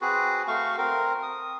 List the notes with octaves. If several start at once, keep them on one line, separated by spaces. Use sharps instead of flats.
C4 F#4 G#4 B4
A3 F#4 F5 C#6
C4 A#4
D#6